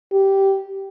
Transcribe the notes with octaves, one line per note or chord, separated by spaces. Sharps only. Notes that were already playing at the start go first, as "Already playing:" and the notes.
G4